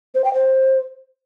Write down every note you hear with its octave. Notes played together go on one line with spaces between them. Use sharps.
C5
G5
C5